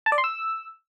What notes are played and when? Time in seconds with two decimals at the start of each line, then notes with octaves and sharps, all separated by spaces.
0.06 A5
0.12 D5
0.18 C6
0.24 E6